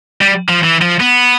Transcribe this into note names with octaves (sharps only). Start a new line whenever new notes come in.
G3
F3
E3
F3
B3